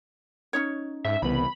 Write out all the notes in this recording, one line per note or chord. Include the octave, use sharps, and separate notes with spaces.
C#4 D#4 C#5
G#2 E5
C2 C#3 E3 B3 B5